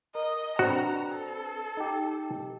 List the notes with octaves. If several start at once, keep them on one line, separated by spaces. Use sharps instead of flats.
A#4 D#5
C4 D4 F#4 B4 A#5
A4
D#4 G4